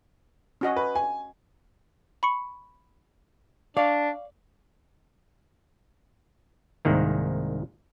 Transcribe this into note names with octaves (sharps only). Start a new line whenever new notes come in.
C#4 F#4 D#5
B4
G#5
B5 C#6 C#7
D4 C#5 D5 F5
C2 G#2 D#3 A#3